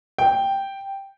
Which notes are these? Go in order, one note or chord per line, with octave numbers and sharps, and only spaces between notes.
G5